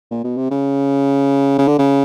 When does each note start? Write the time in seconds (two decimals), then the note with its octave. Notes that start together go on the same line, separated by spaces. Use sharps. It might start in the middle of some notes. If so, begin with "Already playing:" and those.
0.11 A#2
0.24 B2
0.37 C3
0.51 C#3
1.58 C#3
1.68 D3
1.79 C#3